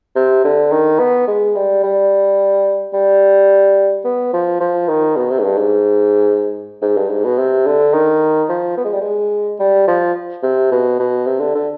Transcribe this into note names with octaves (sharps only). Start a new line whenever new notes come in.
C3
D3
D#3
B3
G#3
G3
G3
G3
B3
F3
F3
D#3
B2
C3
G#2
G2
G#2
G#2
G2
G#2
B2
C3
D3
D#3
F3
B3
G#3
G3
G#3
G3
F3
C3
B2
B2
C3
D3
D3